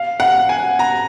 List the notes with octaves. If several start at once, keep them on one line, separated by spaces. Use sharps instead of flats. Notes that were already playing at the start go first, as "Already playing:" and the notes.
Already playing: F5
F#5
G#5
A#5